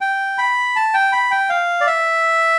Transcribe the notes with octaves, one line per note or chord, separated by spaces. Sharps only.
G5
B5
A5
G5
B5
G5
F5
D5
E5